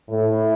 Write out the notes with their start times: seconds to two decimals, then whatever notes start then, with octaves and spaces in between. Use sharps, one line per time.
0.10 A2